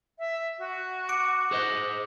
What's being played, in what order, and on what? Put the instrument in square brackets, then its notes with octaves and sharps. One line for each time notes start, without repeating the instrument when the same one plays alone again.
[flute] E5
F#4
[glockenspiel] D6 C#7 D7
[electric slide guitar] G#4 C5 D#5